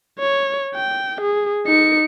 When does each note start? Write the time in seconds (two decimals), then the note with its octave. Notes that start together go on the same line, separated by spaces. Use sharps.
0.19 C#5
0.75 G5
1.21 G#4
1.66 D#4 C#7